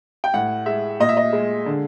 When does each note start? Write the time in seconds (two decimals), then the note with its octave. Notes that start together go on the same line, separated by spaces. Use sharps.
0.24 G5
0.34 A2 F#5
0.66 G#3 E5
1.00 A#2 D#5
1.09 E5
1.17 D#5
1.33 G#3
1.66 D3